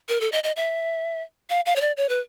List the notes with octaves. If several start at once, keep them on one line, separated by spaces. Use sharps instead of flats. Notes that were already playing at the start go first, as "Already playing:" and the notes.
A#4
A4
D#5
D#5
E5
F5
F5
C#5
D5
C#5
B4